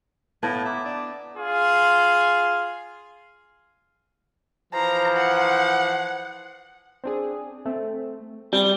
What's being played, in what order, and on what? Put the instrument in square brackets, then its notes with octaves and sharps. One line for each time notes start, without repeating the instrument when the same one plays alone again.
[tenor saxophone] A2 [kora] B3 [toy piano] E4 F5 A5
[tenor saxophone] E4 [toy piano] E5 A#5 D6
[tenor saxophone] D4
[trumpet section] F4 G#4 F5 C6
[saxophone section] E3 F3 C5 [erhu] A#5
[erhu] F#5
[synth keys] C4 D4 G#4
A3 C4
[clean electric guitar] G3 [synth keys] C4